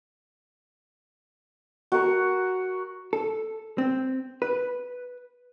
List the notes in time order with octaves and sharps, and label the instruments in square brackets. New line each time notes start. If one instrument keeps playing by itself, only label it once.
[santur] F#4 A#4
[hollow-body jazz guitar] A4
C4
B4